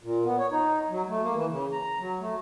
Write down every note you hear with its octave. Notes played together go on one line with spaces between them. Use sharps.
A#2
B3
C#5
D#4
F#3
A3
A#3
E3
C#3
A#5
F#3
A3